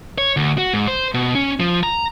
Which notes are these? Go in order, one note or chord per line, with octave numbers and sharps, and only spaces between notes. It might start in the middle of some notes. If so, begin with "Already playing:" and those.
C#5
D2
F#4
G#2
C5
B2
C#4
F3
A#5